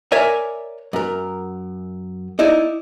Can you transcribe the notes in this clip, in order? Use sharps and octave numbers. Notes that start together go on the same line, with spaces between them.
A#4 C#5 D5 E5 G#5
F#2 A#4
D#4 E4 D5